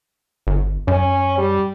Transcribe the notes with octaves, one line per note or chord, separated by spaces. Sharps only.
G1
F#2 C#4
G3